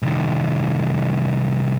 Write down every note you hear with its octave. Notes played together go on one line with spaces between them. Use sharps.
C2 D#3